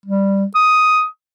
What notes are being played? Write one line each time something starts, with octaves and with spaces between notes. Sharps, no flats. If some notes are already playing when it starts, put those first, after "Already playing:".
G3
D#6